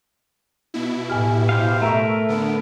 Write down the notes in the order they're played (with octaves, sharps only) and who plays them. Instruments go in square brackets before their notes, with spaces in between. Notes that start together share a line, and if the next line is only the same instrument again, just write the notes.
[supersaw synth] B2 E4
[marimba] A2 G#5 F6 [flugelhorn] G4
[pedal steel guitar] C5 F5
[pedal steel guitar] A3 A#4 [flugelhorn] E5 [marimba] A#5 C#6
[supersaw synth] D3 B3 [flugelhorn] B4